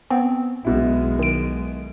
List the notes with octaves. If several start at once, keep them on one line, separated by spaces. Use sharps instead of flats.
B3 C4
B1 B2 G#3 E4
D#3 D7